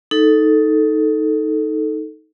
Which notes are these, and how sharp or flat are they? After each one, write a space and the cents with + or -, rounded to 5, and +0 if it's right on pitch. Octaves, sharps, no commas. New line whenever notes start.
D#4 +10 A4 +0